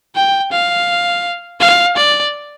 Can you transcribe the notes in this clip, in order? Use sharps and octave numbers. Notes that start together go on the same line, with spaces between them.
G5
F5
F5
D5